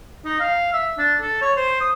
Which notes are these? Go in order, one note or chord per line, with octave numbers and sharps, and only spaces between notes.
D#4
F5
E5
D4
A4
C#5
C5
D#6